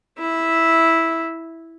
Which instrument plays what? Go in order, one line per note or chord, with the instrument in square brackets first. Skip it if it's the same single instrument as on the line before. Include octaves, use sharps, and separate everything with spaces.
[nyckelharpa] E4 E5